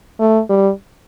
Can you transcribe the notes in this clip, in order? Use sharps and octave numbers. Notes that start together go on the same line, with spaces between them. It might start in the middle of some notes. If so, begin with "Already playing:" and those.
A3
G3